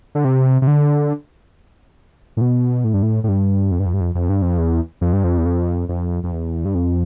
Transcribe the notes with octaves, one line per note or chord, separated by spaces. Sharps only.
D3
C3
C3
D3
A2
B2
A2
G2
A2
A2
G2
F2
G2
F2
G2
F2
F2
G2
F2
E2
F2
G2
F2
E2
F2
F2
F2
E2
G2
F2